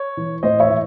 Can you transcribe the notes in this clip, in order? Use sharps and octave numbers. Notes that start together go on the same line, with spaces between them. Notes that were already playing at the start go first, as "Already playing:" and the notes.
Already playing: C#5
E3
A2 C5 D#5
C#5 E5
E3